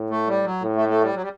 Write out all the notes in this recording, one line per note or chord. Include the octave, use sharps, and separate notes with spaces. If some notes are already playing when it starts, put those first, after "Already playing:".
Already playing: A2
A3
G3
F#3
A2
A3
A3
G3
F#3
G3